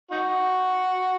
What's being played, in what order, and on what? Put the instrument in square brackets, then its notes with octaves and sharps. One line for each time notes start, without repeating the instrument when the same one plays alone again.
[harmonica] D#4 F#4